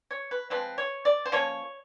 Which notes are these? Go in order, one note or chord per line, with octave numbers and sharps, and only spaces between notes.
C#5
B4
F3 G#3 C4 B4
C#5
D5
C5
F3 A#3 C#4 C#5